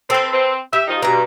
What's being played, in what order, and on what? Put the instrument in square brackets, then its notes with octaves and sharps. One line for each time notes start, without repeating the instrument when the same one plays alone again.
[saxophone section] C4 [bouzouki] A4 B4
[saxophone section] C4
[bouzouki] G4 [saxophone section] E5
[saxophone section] F3 D#4
[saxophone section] G2 [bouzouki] B2 A#5